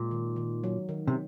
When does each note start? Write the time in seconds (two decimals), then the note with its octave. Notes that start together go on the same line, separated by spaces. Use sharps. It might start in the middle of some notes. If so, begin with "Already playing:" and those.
Already playing: A#2 G#3
0.11 D#3
0.36 D#3
0.64 F#3
0.89 D#3
1.07 C3